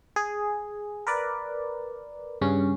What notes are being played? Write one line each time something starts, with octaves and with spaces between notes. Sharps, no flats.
G#4
A#4 B4 D5
G2 C#3 C#4